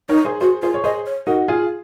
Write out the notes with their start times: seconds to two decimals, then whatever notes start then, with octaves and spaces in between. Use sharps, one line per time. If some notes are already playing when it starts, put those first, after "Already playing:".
0.09 D#4 A#4 C#5
0.25 G#4 C5
0.41 F#4 G#4 C5
0.62 F4 G#4 C5
0.74 C#5
0.84 G#4 C5 D#5
1.06 C#5
1.27 D#4 F#4 A#4
1.48 F4 G#4